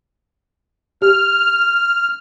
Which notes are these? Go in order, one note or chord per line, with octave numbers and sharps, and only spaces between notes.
G4 F6